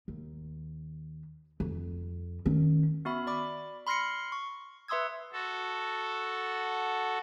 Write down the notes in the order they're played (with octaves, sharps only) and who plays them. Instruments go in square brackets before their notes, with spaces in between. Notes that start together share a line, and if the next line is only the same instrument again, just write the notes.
[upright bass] D#2
F2
D#3 C#4
[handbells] B3 F#4 E5 B5
D5 B5 D6
B5 C6 F6 A#6 C7 C#7
C#6
B4 E5 C6 D#6 E6 G#6
[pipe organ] F#4 A4